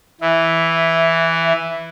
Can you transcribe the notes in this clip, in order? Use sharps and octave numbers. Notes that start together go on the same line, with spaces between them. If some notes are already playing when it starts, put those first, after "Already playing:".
E3 E5